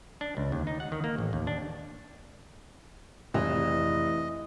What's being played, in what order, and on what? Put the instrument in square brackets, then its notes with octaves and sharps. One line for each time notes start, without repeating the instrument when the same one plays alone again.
[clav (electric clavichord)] D4
C#2
D#2
D#4
F#5
D#3
A#3
A1
D#2
D4
[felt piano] F1 [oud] E3 [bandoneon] D#5